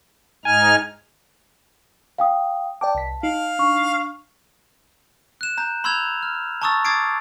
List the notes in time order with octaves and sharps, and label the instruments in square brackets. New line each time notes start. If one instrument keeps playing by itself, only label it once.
[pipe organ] G#2 D#4 F6 [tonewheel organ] G#5
[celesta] F5 G5 D#6
[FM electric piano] D5 G5 D6 [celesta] A5
[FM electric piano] C2 B6
[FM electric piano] D#4 [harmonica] F5
[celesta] D4 C#6
[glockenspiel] F#6 E7
A#5 G6
B5 C6 E6 G6 G#6 F7
F6
A5 A#5 C#6 D#6 E6 A6
D6 D#6 G#6 A6 C7 D7